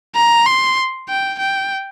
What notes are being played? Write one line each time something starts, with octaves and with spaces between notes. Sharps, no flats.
A#5
C6
G5
G5